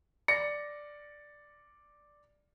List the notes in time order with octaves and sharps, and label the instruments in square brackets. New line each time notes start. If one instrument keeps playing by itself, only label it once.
[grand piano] D5 A#6 C#7